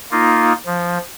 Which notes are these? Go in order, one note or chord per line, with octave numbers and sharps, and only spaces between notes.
A#3 D#4 F4
F3